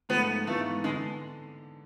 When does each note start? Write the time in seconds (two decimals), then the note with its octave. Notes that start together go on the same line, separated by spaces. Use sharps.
0.09 G#2 F3 A3 B3
0.47 G#2 E3 A3 B3 F4
0.84 D3 G#3